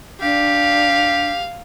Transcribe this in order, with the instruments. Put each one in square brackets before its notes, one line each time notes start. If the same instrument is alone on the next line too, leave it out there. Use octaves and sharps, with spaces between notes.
[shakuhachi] D4 [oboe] G4 [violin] F5